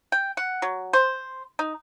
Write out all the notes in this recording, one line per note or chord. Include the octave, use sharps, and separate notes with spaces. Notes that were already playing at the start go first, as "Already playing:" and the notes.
G5
F#5
F#3
C5
D#4